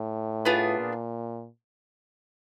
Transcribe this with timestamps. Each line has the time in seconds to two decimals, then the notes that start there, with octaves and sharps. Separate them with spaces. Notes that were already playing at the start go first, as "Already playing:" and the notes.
Already playing: A2
0.45 B3 D4 F4 G#4
0.78 A#2